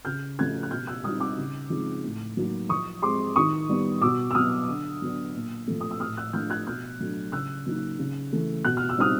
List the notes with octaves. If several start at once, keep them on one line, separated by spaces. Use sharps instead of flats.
C#3 F6 G6
F3 A3 C#4 F#6 G#6
F#6
B2 F6 G6
E6 F#6
G3 C4 D#4 D#6 F6
D6 E6
C#3
F3 G#3 C4 D#4
A2
F#3 A#3 D#4
F3 C#6 D#6
G#3 C4 C6 D6
D#3 C#6 D#6
G3 B3
B2 D6 E6
E6
F#3 B3 D#6 F6
D3
F#3 B3 D4
A#2
F3 A3
D#6
E6
A2 D#6 F6
E6 F#6
F3 A3 D4 F6 G6
F#6 G#6
B2 F6 G6
F#3 A3 D4
C#3 E6 F#6
F#3 A#3 D#4
C#3
E3 A3
B2 F#6
F6
E6
G3 C4 D#4 D#6 F6